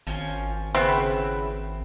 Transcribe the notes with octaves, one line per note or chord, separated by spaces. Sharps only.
G#1 F3 C#4 G#5
C#3 B3 C4 E4 B4